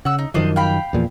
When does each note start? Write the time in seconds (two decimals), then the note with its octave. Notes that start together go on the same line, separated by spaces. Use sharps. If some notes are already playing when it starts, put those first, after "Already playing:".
0.05 C#3 F#5 E6
0.19 D#4
0.34 F#2 D#3 F3 D4 C5 D#5
0.56 F5 G5 B5
0.93 E2 A#2 F3